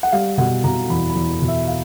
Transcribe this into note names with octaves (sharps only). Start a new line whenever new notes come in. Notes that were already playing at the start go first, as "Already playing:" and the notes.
F#5
G3 F5
B2 F#5
B2 A#5
E2 B5
B5
E2
B2
E5
F5